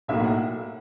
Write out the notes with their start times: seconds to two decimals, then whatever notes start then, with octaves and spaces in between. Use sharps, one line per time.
0.08 B1 A2 F#3 A#3 E5
0.24 F#5